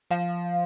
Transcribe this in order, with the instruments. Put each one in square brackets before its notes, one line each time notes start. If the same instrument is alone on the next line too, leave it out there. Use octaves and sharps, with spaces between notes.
[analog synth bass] F3 [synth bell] F5